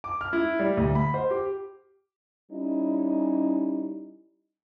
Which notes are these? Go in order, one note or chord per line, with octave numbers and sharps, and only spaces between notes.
D6
F6
E4
G3
D2
B5
C5
G4
G3 C#4 D#4 E4